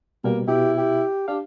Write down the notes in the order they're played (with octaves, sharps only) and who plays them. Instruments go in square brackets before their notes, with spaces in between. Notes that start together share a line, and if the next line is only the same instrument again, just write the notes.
[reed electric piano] B2 G3 [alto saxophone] A#3
[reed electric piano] B2 [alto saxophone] E4 [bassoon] G4
[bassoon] G4
[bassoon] D4 [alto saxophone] G4 [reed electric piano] F5